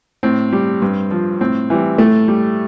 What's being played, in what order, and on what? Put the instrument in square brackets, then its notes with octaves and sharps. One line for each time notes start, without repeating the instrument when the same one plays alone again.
[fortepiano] A2 C4
G3
G2
F3
A2 C4
E3 G3
A2 A3
G3